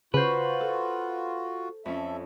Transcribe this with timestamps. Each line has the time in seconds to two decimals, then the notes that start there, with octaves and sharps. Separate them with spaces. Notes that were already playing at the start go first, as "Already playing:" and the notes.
0.14 C#3 F4 F#4 B4 C5 C#6
0.61 A4
1.85 F2 C#4 A4 E5